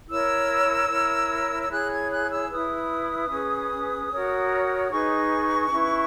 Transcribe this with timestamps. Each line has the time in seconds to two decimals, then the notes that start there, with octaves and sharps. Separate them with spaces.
0.08 E4 A#4 C#5 E6
0.89 E4 A#4 C#5
1.61 E6
1.69 E4 G#4 C#5 F#6
1.90 G#6
2.10 F#6
2.30 E6
2.50 E4 B4 D#6
3.29 C#4 G#4 B4
4.11 F#4 A#4 C#5
4.84 D#6
4.90 D#4 G#4 B4 C#6
5.70 C#4 E4 B4